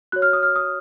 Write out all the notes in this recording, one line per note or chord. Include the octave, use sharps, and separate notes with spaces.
F#4 C#5 F#6
F6
D#6
F6
D#6